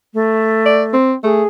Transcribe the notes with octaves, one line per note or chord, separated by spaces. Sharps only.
A3
D5
C4
A3 G#4